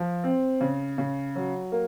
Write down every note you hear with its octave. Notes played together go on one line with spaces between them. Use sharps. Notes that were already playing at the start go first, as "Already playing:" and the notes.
Already playing: F3
C4
C#3
C#3
F#3
A#3